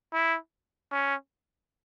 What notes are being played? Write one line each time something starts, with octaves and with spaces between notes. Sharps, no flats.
E4
C#4